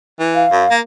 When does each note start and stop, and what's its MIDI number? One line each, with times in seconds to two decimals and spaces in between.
0.19 0.45 52
0.35 0.74 77
0.51 0.65 42
0.71 0.80 58